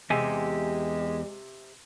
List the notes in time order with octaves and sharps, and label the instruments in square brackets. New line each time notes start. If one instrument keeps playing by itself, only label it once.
[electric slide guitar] E2 G4 G#5 [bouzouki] C3 [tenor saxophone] G#3